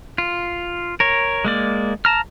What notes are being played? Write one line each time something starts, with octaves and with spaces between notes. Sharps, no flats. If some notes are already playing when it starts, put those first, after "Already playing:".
F4
A#4 C#5
G#3 A#3 D5
A5 A#5 F6